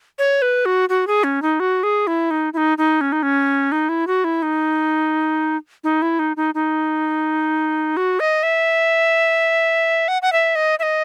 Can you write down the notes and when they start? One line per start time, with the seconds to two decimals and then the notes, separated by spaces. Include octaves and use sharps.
0.19 C#5
0.42 B4
0.65 F#4
0.89 F#4
1.07 G#4
1.24 C#4
1.42 D#4
1.60 F#4
1.83 G#4
2.07 E4
2.31 D#4
2.53 E4
2.57 D#4
2.78 D#4
3.01 C#4
3.12 D#4
3.23 C#4
3.72 D#4
3.89 E4
4.07 F#4
4.24 E4
4.42 D#4
5.84 D#4
6.02 E4
6.19 D#4
6.37 D#4
6.55 D#4
7.97 F#4
8.20 D#5
8.43 E5
10.08 F#5
10.22 F#5
10.32 E5
10.56 D#5
10.79 E5
10.83 D#5